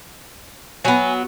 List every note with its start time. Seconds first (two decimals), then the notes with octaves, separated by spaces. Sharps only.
0.85 F#3 B3 G#5